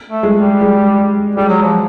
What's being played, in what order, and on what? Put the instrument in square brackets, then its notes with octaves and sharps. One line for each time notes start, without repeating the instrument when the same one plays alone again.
[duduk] A3
[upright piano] G#3
[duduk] G3
[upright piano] G#3
[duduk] G3 [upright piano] G#3
[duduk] F#3
F3